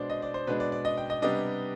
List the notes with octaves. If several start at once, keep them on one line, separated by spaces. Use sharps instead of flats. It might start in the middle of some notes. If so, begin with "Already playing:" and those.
Already playing: B2 G#3 D4 C5 D5
D#5
D5
C5
B2 G#3 D4 B4
D5
D5
D#5
G5
D#5
C3 G3 B3 D4 D#5